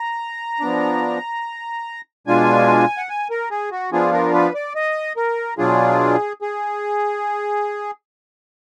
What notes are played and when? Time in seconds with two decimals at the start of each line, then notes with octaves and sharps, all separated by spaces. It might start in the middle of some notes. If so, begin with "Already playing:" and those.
Already playing: A#5
0.60 F3 B3 D4
2.27 B2 G#3 D4 F4 G#5
2.97 F#5
3.09 G#5
3.30 A#4
3.51 G#4
3.72 F#4
3.92 F3 B3 D4 F4 G#4
4.13 A#4
4.34 B4
4.55 D5
4.75 D#5
5.17 A#4
5.58 B2 F#3 D4 F4 G#4
6.42 G#4